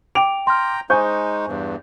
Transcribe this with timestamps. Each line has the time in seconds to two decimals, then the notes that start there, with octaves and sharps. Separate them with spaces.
0.15 G5 D6 D7 F7
0.47 G5 A#5 C6 F6
0.90 G#3 D#4 C5 G#5 C#6 G6
1.47 E2 G2